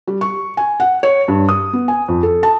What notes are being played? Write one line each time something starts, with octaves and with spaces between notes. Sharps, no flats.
G3
C#6
G#5
F#5
C#5
G2
D#6
B3
G#5
F2
A4
A5